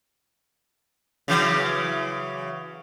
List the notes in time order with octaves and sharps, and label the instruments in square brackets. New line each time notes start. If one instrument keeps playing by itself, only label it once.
[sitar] C#3 E3 F#3